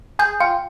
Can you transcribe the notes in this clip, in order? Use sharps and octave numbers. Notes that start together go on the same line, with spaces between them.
G#4 G6
F4 G5